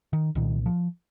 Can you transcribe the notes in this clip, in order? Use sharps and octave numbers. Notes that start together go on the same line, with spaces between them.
D#3
C2 A#2 D#3
F3